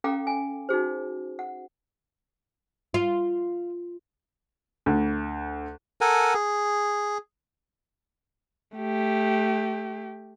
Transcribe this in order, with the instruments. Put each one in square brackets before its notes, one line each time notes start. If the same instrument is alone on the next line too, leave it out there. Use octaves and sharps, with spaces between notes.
[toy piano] C#4 A4 F5 G5 A#5 D6
G#5
D#4 F#4 G#4 C5
F#5
[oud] F4
[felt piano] D2
[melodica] A4 A#4 F#5 G#5
G#4
[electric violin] A3 G4